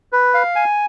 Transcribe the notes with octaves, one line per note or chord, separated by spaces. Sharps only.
B4
F5
G#5